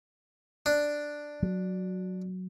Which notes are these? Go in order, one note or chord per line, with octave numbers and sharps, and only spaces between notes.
D4
F#3